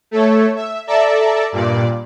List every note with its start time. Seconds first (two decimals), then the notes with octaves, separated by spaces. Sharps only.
0.11 A3 A4 C#5
0.56 E5
0.87 A4 D5 E5 A5 A#5
1.52 G2 A#2 D5